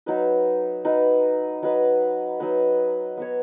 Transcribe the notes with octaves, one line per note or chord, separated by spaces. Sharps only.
F#3 D#4 B4 D#5
F#3 D#4 B4 D#5
F#3 D#4 B4 D#5
F#3 D#4 B4 D#5
B3 F#4 C#5